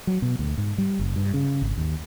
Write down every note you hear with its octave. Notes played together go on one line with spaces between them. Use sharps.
F#3
B2
D2
G#2
G3
F#1
G2
C#3
G#1
D#2